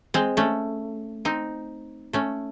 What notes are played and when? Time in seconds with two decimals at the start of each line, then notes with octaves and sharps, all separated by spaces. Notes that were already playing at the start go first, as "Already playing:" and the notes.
0.14 G#3 C4
0.37 A3 C#4
1.25 C4 D#4
2.13 A3 C#4